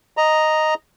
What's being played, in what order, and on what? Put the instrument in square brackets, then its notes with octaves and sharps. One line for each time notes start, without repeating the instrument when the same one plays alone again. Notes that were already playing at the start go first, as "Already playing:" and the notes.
[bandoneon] D#5 A#5